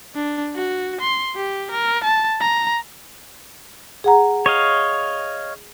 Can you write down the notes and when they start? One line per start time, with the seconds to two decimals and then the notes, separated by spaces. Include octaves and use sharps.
0.15 D4
0.56 F#4
1.01 C6
1.36 G4
1.71 A#4
2.04 A5
2.40 A#5
4.04 G#4 F#5 A#5
4.46 C#5 D#5 F5